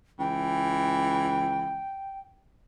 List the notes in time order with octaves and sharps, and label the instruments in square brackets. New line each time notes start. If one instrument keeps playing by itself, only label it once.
[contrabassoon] C#2 [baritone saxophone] E3 [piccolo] G5